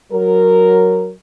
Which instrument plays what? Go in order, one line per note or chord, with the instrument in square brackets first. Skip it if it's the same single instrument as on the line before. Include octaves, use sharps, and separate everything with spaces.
[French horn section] F#3 A#4